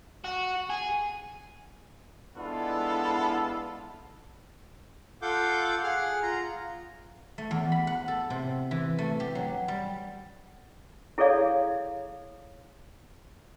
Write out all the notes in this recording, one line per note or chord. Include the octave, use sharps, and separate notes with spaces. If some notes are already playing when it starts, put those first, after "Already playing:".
F#4
G#4
G#3 B3 D4 E4 F4 A4
F4 A4 F5 F#5 D6 G6
G#4 F#5 F6
F4 A#5
A3
E2
B5
F#5
A4
C3
E3
A3
G4
F#3
G3
E4 G#4 A4 C#5 D5 F5